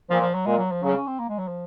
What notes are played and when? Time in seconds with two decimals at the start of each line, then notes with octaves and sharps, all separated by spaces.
0.10 A#2 F3
0.22 F3
0.35 F#3
0.46 A#2 G#3
0.58 F#3
0.71 F3
0.83 C#3 F#3
0.95 C#4
1.07 C4
1.19 A#3
1.29 G#3
1.39 F#3
1.48 F3